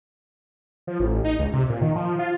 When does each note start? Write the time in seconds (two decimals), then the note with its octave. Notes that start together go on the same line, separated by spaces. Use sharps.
0.87 F3
1.00 A1
1.24 D#4
1.39 C#2
1.53 C3
1.69 A#2
1.81 D#3
1.95 F3
2.19 F4